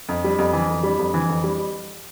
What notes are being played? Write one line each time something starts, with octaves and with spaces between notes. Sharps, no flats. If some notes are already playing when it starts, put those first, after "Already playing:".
F2
G3
F2
E3
F2
G3
F2
E3
F2
G3